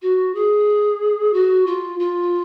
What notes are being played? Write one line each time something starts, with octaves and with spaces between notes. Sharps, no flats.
F#4
G#4
F#4
F4
F4